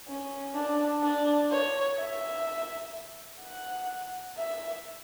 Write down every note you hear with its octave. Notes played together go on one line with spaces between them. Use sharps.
C#4
D4
D4
C#5
E5
F#5
E5